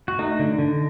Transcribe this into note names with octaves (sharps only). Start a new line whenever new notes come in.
F#4
A3 D#4
D3
D3